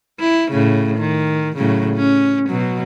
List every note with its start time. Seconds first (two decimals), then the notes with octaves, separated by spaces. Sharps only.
0.20 E4
0.52 A2 C#3
0.98 D#3
1.56 A2 C#3 F#3
1.95 C#4
2.49 B2 F#3